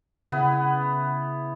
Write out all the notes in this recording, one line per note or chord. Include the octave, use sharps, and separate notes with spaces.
C#3 B3 E4